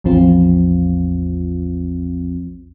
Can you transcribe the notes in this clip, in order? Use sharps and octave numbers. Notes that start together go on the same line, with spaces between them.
A1 E2 F3 C4 F4